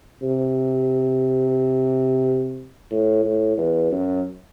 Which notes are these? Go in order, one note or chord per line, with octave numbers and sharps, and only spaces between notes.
C3
A2
A2
E2
F#2